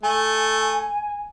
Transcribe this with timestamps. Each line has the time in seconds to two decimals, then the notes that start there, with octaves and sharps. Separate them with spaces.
0.03 A3 G#5